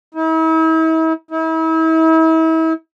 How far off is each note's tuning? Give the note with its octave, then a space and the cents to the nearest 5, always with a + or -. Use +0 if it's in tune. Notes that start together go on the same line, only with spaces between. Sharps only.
E4 -45
E4 -40